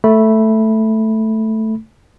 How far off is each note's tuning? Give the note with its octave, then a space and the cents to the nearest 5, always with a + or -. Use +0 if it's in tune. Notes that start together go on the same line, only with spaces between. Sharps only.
A3 +0 B5 -10